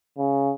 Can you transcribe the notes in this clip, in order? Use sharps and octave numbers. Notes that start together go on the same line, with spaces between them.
C#3